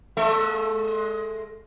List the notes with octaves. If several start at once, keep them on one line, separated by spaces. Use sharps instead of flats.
G#3 A4 E5